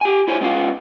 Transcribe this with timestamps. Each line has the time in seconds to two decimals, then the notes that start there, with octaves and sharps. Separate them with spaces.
0.01 G4 G#5
0.28 E4 C5 C#5 G#5
0.41 G#3 B3 C#4 F4 F5